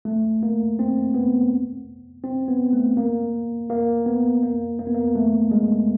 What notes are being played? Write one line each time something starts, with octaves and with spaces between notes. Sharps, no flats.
A3
A#3
C4
B3
C4
B3
A3
A#3
A#3
B3
A#3
A#3
B3
A#3
A3
G#3